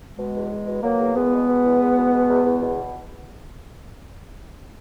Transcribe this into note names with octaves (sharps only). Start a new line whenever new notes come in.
B2 G#3
E2
E2
B2
B2 F#3 A#3
E2
E2 G#3 B3
B2
B2
E2
E2
B2
B2
E2
E2
B2